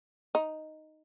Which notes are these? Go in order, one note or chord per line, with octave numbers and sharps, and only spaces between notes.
D#4